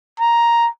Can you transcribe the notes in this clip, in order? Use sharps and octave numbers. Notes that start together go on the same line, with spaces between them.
A#5